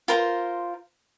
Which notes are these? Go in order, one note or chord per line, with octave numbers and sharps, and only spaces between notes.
F4 A#4 C5 A#5